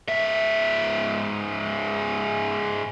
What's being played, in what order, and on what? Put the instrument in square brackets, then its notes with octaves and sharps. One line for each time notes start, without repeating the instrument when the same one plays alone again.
[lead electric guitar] G#2 E5